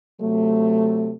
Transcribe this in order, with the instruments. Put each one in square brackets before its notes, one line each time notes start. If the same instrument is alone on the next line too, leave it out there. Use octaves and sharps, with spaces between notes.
[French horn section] C3 F#3 A3